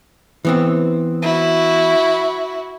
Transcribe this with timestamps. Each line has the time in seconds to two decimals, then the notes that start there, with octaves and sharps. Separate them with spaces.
0.45 E3 B3 C4
1.22 E4 F#4